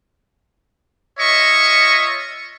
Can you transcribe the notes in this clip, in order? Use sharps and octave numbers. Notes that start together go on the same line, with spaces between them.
F4 C#5 D#5 E5 C#6